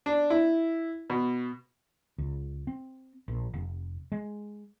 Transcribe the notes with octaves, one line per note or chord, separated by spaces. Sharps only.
D4
E4
B2
C#2
C4
A#1
F1
G#3